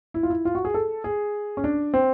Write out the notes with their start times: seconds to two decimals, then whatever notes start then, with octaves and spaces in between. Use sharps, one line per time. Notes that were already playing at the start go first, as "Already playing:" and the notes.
0.14 E4
0.23 F4
0.30 E4
0.45 F4
0.55 F#4
0.65 G#4
0.74 A4
1.04 G#4
1.57 C#4
1.64 D4
1.94 C4